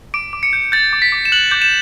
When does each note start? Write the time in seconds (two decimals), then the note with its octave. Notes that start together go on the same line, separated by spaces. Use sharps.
0.14 D6 D7
0.33 D6
0.43 C#7
0.53 G6
0.72 G6 A6
0.93 D6
1.02 B6
1.12 D6
1.25 E7
1.32 F#6 F#7
1.51 D6 G6
1.62 E7